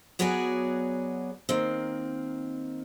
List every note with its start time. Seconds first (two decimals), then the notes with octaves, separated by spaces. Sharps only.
0.19 F#3 B3 F#4 G#4 C#5 D5
1.49 D#3 A#3 C4